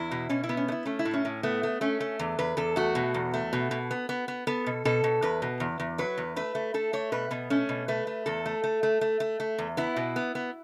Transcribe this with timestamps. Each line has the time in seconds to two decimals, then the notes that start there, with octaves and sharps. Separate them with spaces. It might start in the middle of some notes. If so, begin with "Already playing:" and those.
Already playing: E2 E4
0.11 B2
0.29 B2 C#4
0.44 E4
0.49 B3
0.57 C#4
0.68 A3
0.72 E4
0.85 A3 C#4
0.99 E4
1.05 A2
1.14 C#4
1.25 A2
1.43 A3 B3
1.63 A3
1.81 A3 C#4
2.00 A3
2.19 E2
2.39 E2 B4
2.57 E2 A4
2.76 A3 F#4
2.95 B2
3.14 E2
3.34 A3
3.53 B2
3.71 B2
3.91 B3
4.09 B3
4.28 B3
4.47 B3 A4
4.66 B2
4.85 B2 A4
5.04 B2
5.22 E2 B4
5.42 B2
5.60 E2
5.80 E2
5.98 F#3 B4
6.17 E2
6.36 A3 B4
6.55 A3
6.74 A3 A4
6.93 A3 C#5
7.12 B2 B4
7.31 B2 B3
7.50 A3 C#4
7.69 B2
7.88 A3 B4
8.07 A3
8.26 E2 A4
8.46 A3
8.64 A3
8.83 A3
9.01 A3
9.20 A3
9.40 A3
9.58 E2
9.77 B3 E4
9.96 B2
10.16 B3
10.35 B3